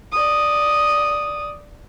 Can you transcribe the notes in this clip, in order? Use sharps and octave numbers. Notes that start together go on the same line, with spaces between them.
D5 D#6